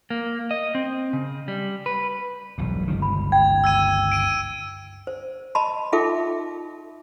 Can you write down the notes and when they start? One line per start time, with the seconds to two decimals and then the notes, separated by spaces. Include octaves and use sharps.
0.10 A#3
0.51 D#5
0.75 C4
1.13 C#3
1.48 G3
1.86 B4
2.58 E1 B1 G2
2.88 G1 C#2 D#3
3.02 B5
3.32 G5 G#6
3.64 E6 G#6 D#7
4.12 D7 D#7
5.07 C5
5.55 D#5 A5 B5 C6
5.92 D#4 F4 A4 E5 G5 D6